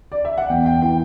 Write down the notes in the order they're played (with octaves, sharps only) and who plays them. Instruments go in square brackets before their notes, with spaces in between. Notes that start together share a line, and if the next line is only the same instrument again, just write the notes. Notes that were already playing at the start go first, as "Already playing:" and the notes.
[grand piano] D5
E5
F#5
E2 G5
G5
E3 G5